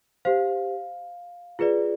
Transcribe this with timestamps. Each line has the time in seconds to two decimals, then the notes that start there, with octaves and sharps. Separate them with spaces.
0.25 G4 C5 F5
1.59 F4 G#4 B4 D5